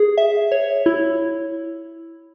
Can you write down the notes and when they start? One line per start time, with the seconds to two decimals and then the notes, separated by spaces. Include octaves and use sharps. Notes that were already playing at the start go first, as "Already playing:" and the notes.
Already playing: G#4
0.18 E5
0.52 C#5
0.86 E4